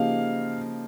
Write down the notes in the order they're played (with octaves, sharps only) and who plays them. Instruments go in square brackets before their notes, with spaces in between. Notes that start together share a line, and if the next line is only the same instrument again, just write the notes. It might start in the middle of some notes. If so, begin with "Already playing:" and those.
Already playing: [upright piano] C#3 F3 A#3 D#4 G4 [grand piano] F5